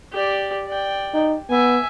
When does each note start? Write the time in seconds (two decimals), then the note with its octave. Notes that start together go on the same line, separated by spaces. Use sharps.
0.12 G4 D5
0.67 D5 G5
1.14 D#4
1.50 B3 E5 G#5